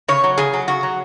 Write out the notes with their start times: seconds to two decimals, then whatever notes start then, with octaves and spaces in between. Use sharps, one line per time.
0.08 C#3 C#5
0.24 F#3
0.38 C#3 G#4
0.54 F#3
0.68 C#3 F#4
0.83 F#3